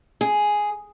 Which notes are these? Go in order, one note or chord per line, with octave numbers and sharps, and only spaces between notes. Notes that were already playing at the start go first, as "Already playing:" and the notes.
G#4